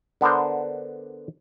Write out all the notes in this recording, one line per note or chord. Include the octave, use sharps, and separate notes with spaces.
D3 B3 D4 A#4 C5